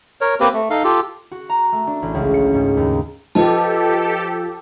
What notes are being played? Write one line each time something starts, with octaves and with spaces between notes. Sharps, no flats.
A#4 C#5
A#3 C4 G4 B4
A3
D#4 A4 F5
F4 G4 A4
F#4
A#5
A3
D4
A1
C#2
C#7
G#2
D#2
F3 G4 A4 B4 D#5 A5